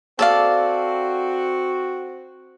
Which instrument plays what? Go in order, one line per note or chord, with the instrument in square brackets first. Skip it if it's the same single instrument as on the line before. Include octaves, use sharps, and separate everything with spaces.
[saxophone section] C4 F#4 [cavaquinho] A4 D5 F5